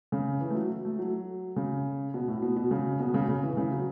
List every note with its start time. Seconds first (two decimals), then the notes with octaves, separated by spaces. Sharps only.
0.12 C#3
0.41 E3
0.50 A3
0.55 F#3
0.85 A3
0.99 F#3
1.56 C#3
2.14 B2
2.28 A2
2.42 B2
2.57 B2
2.71 C#3
3.00 B2
3.14 C#3
3.28 C#3
3.43 E3
3.57 C#3
3.71 F#3